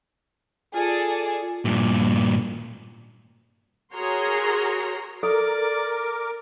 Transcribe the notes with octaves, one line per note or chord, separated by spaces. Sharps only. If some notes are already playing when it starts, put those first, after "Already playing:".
F4 G#4 A4 D5
G2 A#2
F#4 G#4 A#4 C#5 A#5 C6
A4 A#4 D5 D6